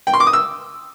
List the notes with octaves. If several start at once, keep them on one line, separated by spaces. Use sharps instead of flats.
G5
C6
D6
D#6
E6